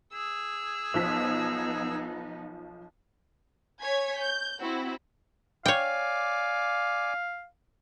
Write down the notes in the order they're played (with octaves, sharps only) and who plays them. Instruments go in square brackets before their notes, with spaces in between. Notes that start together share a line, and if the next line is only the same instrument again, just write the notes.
[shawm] G#4 [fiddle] E6
[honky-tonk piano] B1 F3 B6 [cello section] B3 D#4
[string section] C#5 G#5 G#6 B6
G6
C4 E4 F#4
[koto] C#5 G5 [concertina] D5 G#5 D6 [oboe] F5